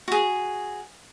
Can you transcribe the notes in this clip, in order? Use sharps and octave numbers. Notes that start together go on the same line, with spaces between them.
F#4 G#4